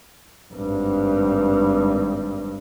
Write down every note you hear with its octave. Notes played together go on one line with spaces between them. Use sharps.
G#1 G2